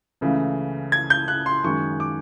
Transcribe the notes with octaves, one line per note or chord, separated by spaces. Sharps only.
C#2 C#3 E3 A3
G#6
G6
F#6
C6
F#2 D#3 G#3 C#6
D6